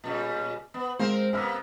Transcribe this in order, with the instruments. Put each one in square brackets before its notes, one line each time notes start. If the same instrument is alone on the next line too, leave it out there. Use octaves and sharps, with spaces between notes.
[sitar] A#2 C#3 G3
B3
[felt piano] G#3 F5 [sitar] C4 A#4 C5
[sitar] C3 A#3 B3 [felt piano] E6 F6